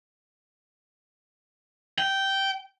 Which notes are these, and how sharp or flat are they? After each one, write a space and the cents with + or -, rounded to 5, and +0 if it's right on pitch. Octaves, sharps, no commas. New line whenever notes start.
G5 -10